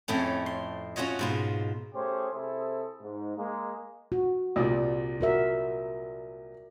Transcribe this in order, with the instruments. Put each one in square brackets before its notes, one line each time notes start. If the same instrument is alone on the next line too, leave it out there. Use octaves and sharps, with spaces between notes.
[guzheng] F2 A2 A3 C#4
C6
C#4 F4 F#4 C#5 D#5
G#2 B2 F4
[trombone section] A3 C#4 G4 G#4 C5
C3 E4 G#4 A4 C5
G#2
G#3 A#3
[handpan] F#4
[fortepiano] C2 A#2 D5
[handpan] F#4 A#4 E5